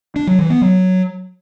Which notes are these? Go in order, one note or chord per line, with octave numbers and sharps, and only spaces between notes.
D4
F#3
E3
B3
F#3